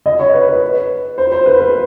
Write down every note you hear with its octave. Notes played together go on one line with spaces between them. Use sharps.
D#5
C#5
B4
B4
C5
C5
B4
B4